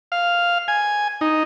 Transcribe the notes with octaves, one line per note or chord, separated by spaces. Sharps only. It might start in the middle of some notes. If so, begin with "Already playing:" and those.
F5
G#5
D#4